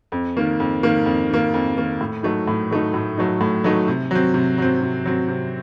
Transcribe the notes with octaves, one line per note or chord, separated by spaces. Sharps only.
F2
D#3 A#3
F2
D#3 A#3
F2
D#3 A#3
F2
D#3 A#3
A2
F#3 A3 D#4
A2
F#3 A3 D#4
A2
F#3 A3 D#4
A2
F#3 A3 D#4
C3
F#3 C4
C3
F#3 C4
C3
F#3 C4
C3